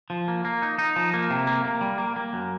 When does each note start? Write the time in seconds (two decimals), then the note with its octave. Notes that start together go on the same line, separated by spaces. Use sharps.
0.10 F3
0.28 A#3
0.45 A#3
0.62 D#4
0.78 D#4
0.96 F3
1.14 A#3
1.30 C3
1.47 A#3
1.65 A#3
1.81 G3
1.98 A#3
2.16 A#3
2.33 F#2